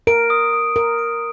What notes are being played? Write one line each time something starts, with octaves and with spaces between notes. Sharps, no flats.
A#4 D7
D#6
D#6
A#4 D7
D7